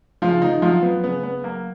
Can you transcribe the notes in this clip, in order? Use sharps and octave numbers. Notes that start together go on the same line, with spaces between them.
C#3 F3 F4
D#3 D#4
F3 F#3 F4
B3
C#3 B3
B3
F#3 A#3